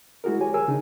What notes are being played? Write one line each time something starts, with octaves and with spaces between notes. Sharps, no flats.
G#3 E4 F#4 G#4 A#4
G4 C#5 G#5
G#4 A#4 G#5 E6
C#3 D4 D#4